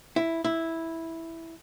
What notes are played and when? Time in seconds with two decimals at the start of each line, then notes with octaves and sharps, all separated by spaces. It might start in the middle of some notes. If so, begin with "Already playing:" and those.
0.16 E4
0.44 E4